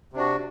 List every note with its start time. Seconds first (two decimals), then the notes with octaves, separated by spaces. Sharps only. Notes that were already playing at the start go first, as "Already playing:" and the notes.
0.13 C3
0.16 D4
0.19 F#4